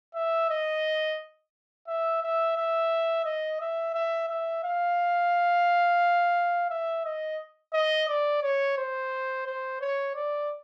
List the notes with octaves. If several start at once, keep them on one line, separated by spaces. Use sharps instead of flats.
E5
D#5
E5
E5
E5
D#5
E5
E5
E5
F5
E5
D#5
D#5
D5
C#5
C5
C5
C#5
D5